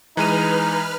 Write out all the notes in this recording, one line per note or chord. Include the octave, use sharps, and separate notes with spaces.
E3 G#3 D#4 B4 A#5 F6 D#7